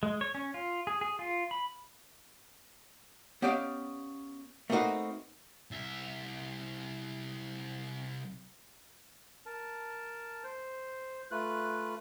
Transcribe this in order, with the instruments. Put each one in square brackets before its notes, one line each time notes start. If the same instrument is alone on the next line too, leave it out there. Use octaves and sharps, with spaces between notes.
[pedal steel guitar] G#3
C#5
C#4
F4
G#4
G#4
F4
B5
[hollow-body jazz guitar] B3 C#4 G4 D5 D#5 F5
A3 A#3 C4 D#4 F#4 B4
[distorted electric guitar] C2 E5
[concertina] A#4 A5
C5
A3 F4 B4 F#6